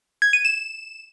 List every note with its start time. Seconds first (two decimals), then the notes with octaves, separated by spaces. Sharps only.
0.22 G#6
0.33 D#7
0.45 E7